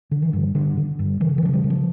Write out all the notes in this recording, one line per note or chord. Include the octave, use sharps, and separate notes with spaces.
D3
E3
G2
G2 D3
D3
G2
C#3 E3
E3
C#3 F3
G3
C#3
F3